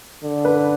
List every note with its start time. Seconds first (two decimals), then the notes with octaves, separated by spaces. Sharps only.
0.24 D3
0.45 B4